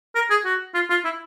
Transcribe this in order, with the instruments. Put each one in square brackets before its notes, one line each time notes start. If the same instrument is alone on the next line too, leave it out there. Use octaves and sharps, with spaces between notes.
[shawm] A#4
G#4
F#4
F4
F4
E4